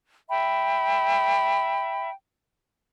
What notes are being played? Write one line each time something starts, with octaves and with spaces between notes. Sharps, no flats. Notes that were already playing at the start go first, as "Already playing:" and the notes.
E5 G5 B5